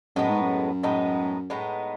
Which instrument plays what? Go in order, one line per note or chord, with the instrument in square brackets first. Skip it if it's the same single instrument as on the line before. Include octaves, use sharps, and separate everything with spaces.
[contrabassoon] F#2 [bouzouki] A2 G#3 B3 D#4
[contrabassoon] G#2
F#2
[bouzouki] A2 G#3 B3 D#4
A2 G#3 B3 D#4